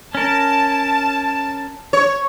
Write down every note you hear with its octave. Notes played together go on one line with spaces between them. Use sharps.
C#4 A#4 A5
C#5